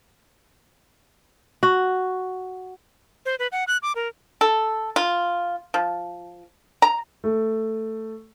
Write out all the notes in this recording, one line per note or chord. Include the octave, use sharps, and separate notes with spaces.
F#4
C5
B4
F#5
F#6
D6
A#4
A4
F4
F3
A#5
A3